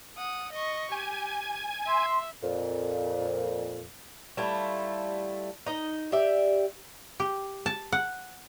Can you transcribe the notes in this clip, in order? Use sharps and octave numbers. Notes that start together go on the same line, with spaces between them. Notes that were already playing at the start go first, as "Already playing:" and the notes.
F#5 D#6
D#5 C#6
G4 G#5
E5 C6
F2 A#2
G3 A3 E4 F4
D#4 D#5
G4 D5 E5
G4
A5
F#5